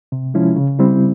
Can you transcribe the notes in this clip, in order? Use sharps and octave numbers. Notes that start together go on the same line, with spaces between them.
C3
F3 G#3 C#4 E4
C#3
G3 C4 E4